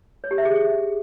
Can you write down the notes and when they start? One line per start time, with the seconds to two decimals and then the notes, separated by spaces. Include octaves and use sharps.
0.24 C#5
0.31 G4
0.38 E5
0.45 G#4